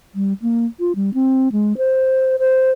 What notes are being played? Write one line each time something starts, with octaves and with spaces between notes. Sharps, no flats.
G3
A#3
F4
G3
C4
G#3
C5
C5